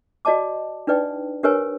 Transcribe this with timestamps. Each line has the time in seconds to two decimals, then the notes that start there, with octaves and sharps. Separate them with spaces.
0.25 F#4 D5 D#5 A5 D6
0.87 D4 D#4 B4 D5 G5
1.43 D4 G4 A#4 B4 C#5 G#5